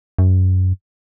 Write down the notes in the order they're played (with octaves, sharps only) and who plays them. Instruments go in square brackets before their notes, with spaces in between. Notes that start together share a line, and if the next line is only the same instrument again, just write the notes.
[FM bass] F#2